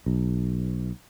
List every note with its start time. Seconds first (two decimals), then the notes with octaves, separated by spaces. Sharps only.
0.06 B1